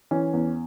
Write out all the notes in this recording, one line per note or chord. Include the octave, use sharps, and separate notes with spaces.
E3 C#4
E2